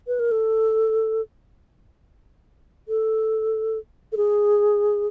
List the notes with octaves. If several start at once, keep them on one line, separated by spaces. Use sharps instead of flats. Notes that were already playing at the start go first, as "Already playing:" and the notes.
B4
A#4
A4
A4
A4
G#4